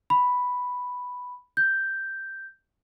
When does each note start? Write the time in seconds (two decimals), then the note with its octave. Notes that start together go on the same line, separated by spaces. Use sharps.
0.10 B5
1.57 G6